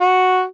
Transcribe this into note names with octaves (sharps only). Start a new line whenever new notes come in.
F#4